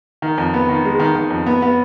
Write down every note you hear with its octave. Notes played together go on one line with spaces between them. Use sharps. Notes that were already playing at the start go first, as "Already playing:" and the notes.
D#3
F2
B3
D#3
G#3
D#3
D#3
F2
B3
B3